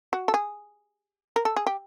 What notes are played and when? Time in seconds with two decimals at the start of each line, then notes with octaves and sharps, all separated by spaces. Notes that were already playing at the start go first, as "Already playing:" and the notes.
0.13 F#4
0.28 A4
0.34 G#4
1.36 A#4
1.45 A4
1.56 G#4
1.67 G4